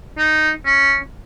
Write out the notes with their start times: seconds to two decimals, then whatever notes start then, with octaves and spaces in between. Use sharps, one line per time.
0.18 D#4
0.65 C#4